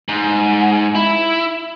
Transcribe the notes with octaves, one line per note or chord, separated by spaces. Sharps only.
G#2
E4